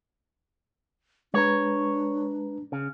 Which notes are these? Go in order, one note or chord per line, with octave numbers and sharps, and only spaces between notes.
G#3 D4 B4 C#5 A#5
C#3